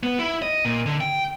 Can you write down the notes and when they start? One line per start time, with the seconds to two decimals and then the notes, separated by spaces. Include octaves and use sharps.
0.03 B3
0.19 E4
0.42 D#5
0.65 A#2
0.86 D3
1.01 G5